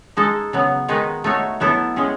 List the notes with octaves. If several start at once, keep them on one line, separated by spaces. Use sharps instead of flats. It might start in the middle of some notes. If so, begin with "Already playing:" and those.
G#3 D#4 A4
C#3 F#3 B3
D#3 G#3 D#4 F#4 B4
A3 D#4 F#4 C#5
F#3 B3 E4 A4
G#3 C#4 G#4